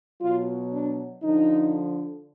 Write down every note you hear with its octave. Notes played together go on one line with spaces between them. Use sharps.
B2 F#3 F4
D4
D3 F3 D#4